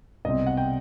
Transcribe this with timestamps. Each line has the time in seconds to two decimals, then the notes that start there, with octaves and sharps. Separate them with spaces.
0.25 C2 B2 G3 C4 D#5
0.47 F#5
0.57 G5